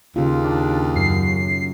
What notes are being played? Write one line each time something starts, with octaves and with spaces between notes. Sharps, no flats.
D#2 C#3 F4
D4
F#2 C7